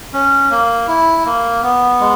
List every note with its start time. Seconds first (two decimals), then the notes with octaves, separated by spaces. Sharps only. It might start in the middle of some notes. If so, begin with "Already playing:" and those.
0.13 C#4
0.50 A#3
0.87 E4
1.25 A#3
1.63 B3
2.00 G#3